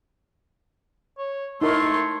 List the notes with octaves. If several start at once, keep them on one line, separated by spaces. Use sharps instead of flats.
C#5
A3 D#4 E4 A#4 C#5 C6